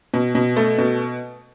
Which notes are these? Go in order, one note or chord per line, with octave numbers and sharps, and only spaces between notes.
B2
B2
A3
B2